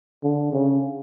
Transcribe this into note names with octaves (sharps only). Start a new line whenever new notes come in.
D3
C#3